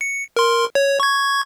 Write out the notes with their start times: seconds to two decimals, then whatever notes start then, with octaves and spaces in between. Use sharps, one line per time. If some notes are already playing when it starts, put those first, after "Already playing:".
0.01 C#7
0.37 A#4 C6
0.75 C#5
1.00 C#6 G#6